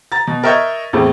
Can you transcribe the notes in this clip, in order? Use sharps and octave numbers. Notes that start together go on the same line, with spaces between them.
A#5 A6
B2
A#4 D#5 E5 C#6 G6 G#6
E2 A2 C4